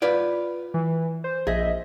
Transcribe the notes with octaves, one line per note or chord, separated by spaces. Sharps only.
F4 B4 D5
E3
C5
A#1 G#4 D#5 E5